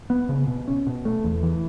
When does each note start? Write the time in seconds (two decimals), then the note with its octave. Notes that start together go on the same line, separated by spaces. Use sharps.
0.10 B3
0.29 C#3
0.47 B2
0.68 C#4
0.87 B2
1.05 A3
1.24 E2
1.43 E3